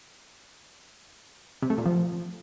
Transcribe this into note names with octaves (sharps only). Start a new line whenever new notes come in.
C3
A3
A#2
F3